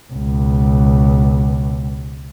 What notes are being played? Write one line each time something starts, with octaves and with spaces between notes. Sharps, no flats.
C#2 B2